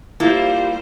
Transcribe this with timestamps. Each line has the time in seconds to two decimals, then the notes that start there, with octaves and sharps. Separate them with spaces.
0.20 G3 A#3 E4 F4 C5